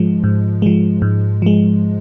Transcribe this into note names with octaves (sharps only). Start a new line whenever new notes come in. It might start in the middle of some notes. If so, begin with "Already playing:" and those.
Already playing: G#2 F3 G#3
G#2
F3 G#3
G#2
F3 G#3